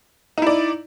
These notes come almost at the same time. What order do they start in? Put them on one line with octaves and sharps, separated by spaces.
D#4 E4 D5